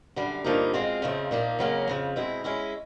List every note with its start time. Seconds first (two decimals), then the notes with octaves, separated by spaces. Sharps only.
0.16 F#2 D3 G3
0.44 G2 D3 F3 A#3 D#4
0.73 B2 G#3 C4 F4 G#4
1.02 F2 C#3 F3 A3 C4
1.31 A#2 F3 A#3 D#4
1.59 F2 C#3 F#3 A#3 C#4
1.88 F2 C#3 F3
2.16 B2 G#3 C4 E4
2.44 G#3 C#4 E4